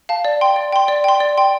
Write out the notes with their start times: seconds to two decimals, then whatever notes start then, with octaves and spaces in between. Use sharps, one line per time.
0.09 F5 A5
0.25 D5
0.41 G5 C6
0.56 D5
0.72 G5 C6
0.88 D5
1.04 G5 C6
1.20 D5
1.37 G5 C6